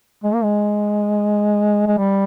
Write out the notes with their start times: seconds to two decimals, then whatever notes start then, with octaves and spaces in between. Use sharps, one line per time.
0.24 G#3
0.34 A#3
0.43 G#3
1.87 G#3
1.98 G3